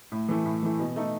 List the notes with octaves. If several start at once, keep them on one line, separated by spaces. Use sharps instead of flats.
A2
E3 A3
A2
E3 A3
B2
A3 D#4